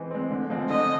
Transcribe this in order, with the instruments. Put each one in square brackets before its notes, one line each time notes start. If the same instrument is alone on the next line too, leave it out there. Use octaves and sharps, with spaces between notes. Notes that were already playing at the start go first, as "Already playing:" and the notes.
Already playing: [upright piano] E3 G#3 C4
G#3 C4
D3
F3 G#3 C4
[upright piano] D3 [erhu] D#5